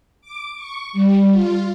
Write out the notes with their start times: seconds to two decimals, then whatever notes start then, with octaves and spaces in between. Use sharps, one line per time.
0.21 D6
0.55 C#6
0.93 G3
1.31 F4